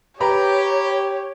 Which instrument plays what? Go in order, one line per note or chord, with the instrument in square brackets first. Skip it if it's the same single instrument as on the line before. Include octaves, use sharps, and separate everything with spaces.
[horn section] G4 [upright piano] B4 A#5 B5 [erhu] C#5